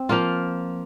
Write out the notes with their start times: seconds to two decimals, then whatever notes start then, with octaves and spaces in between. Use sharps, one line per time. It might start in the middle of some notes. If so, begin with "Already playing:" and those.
Already playing: C4
0.09 F3 A#3 F4